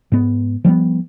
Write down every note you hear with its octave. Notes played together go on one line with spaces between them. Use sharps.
G#2 B3
F3 G3 A3 B3